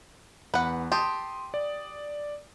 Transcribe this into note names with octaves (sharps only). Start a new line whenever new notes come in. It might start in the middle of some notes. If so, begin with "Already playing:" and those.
E2 B4 F#5
G4 A5 C6 D#6
D5